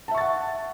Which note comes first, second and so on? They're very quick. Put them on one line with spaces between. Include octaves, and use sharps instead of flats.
A5 E5 C#6 A6 F#5